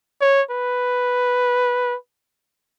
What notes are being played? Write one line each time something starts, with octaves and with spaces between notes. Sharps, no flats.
C#5
B4